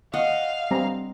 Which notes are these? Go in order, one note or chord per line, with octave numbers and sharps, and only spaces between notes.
D#5 F5 F#5
G3 C4 A#5